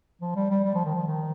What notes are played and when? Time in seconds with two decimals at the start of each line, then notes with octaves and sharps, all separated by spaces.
0.22 F3
0.36 G3
0.51 G3
0.65 G3
0.75 F3
0.86 D#3
0.95 F3
1.08 D#3